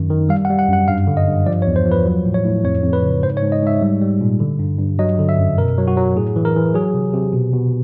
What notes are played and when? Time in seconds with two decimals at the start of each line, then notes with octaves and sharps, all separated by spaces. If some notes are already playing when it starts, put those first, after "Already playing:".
Already playing: F#2 D#3
0.10 D#3
0.29 G3 F5
0.45 F#5
0.50 G3
0.59 F#5
0.69 F#2 F#5
0.88 G2 F5
1.07 D3
1.17 D#5
1.28 G2
1.46 F3 D5
1.62 C#5
1.67 E2
1.76 C5
1.86 F3
1.92 B4
2.06 F#3
2.26 A2
2.34 C#5
2.44 A2
2.64 F2 C#5
2.83 F2
2.93 B4
3.03 C#3
3.23 G#2 C5
3.37 C#5
3.42 G#2
3.52 D#5
3.62 G#2 E5
3.82 G3
4.02 G3
4.21 A#2
4.40 D3
4.59 G2
4.79 G2
4.99 F#3 D#5
5.19 D3
5.29 E5
5.39 F#2
5.58 B2 A#4
5.78 F#3
5.88 F#4
5.97 F#3
6.16 A2 G#4
6.36 E3
6.45 A#4
6.56 E3
6.74 F#3 G#4
6.94 C3
7.13 C3
7.33 B2
7.53 B2